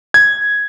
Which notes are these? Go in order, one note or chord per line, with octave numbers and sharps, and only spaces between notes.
G#6